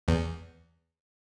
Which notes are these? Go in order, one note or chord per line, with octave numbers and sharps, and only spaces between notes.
E2